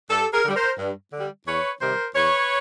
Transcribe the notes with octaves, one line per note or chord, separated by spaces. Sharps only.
G2 G4 A4
G#4 A#4
D3 G3
A#4 C5
G2
D3
G3
E2 B4 C#5
C3 D#3 G3 A#4 C5
E2 B4 C#5